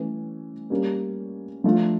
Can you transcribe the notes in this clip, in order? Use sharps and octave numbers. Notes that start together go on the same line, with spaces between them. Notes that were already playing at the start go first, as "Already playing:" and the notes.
Already playing: E3 A3 C#4
G3 A#3 C#4
F3 A3 D4 F4